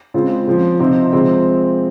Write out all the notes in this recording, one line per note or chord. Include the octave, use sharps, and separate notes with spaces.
C#3 G#3 C4 F4
C#3 F3 C4
C3 F3 C4 D#4
C3 F3 G#3 C4